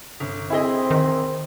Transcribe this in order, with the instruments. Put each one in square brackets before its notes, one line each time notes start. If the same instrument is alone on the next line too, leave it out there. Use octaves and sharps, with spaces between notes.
[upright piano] G1
[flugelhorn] C4 [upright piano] E4 G#4 D#5
[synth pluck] D#3